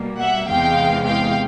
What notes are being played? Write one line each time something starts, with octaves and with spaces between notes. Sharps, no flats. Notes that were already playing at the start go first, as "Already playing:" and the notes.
Already playing: B2 G3 A#3
E5 F#5
E2 C3 E3 G#3 F5 G5
F5 G5